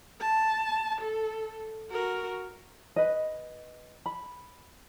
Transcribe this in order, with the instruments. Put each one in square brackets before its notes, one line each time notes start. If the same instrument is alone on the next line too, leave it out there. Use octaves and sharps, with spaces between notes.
[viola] A5
A4
F#4 A#4
[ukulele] B4 D#5
B5